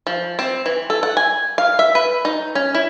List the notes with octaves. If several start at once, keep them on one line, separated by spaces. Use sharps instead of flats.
F3
C4
E3
A4
F#5
G#5
F5
E5
B4
D#4
C#4
E4